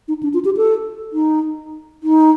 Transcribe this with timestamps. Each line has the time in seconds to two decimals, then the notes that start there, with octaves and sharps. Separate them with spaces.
0.08 D#4
0.23 D4
0.34 F4
0.45 G4
0.57 A4
1.13 D#4
2.03 D#4